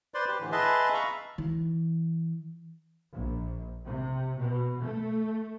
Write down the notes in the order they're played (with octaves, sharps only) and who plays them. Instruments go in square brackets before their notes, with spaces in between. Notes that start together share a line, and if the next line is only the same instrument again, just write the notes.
[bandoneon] B4 C5 D5 C6
G4 B4
A2 D3 E3
G#4 B4 D#5 E5 A5 C6
E5 F5 A#5 B5 C#6
[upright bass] E3
[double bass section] A#1
C3
B2
A3